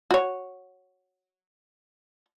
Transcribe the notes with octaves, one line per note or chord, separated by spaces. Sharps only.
F#4 C#5